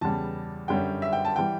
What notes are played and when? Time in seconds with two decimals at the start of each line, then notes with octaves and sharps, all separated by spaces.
0.01 E2 C#3 G3 A5
0.68 F#2 D3 G3 C#4 G5
1.02 E5
1.13 G5
1.25 A5
1.36 E3 G3 G5